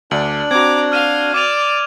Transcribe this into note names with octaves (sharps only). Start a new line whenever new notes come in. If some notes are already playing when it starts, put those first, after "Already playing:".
D2 D4 D5 F#7
C4 F#4 A#5 D6 G#6
F5 F6 D#7
D5 D6 D#7 F7